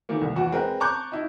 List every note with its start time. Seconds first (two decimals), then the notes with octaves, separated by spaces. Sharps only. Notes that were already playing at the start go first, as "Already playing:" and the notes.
0.09 D#3 E3 A3 A#3
0.21 C2
0.36 E2 E3 F4 F#4 F#5
0.52 G#3 C4 A#4 B4
0.80 A5 A#5 C#6 D6 F#6 G6
1.12 D#4 E4